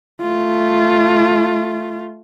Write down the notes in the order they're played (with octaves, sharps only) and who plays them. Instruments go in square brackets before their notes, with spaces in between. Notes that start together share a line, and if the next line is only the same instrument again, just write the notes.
[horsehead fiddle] A3 F4